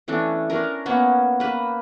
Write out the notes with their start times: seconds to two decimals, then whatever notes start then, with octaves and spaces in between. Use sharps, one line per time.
0.08 E3 A3 C#4 D4
0.50 C#4 D4 A#4
0.86 A#3 B3 C#4 C#5
1.40 A#3 B4